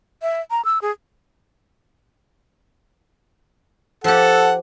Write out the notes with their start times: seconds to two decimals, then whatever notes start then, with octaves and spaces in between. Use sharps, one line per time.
0.22 E5
0.51 A#5
0.65 E6
0.82 G#4
4.04 F3 G4 A4 F#5